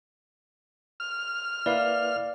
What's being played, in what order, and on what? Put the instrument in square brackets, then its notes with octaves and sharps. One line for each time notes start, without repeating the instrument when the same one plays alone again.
[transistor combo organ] F6
[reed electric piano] A#3 E4 B4 [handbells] D5 F5